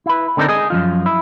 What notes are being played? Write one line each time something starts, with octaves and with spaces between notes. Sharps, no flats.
E4 B4
D3 C4 D4 D#4 A#4
G#4 D#5
F#2 F3 F4
E4